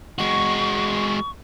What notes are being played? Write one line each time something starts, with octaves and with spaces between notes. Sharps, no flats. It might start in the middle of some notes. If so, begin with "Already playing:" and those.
G#3 F#4 C#6